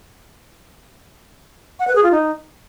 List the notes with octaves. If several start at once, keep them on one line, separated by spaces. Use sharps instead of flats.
F#5
B4
G#4
F4
D#4